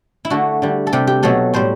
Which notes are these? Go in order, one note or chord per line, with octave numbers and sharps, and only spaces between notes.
E4
D3 A3 F#4
D3 G3
A4
C3 G3 G4
G4
B2 F#3 A3 A4
A2 G3 C5